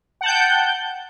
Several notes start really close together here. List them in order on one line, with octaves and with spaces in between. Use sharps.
F#5 A5 G6 G5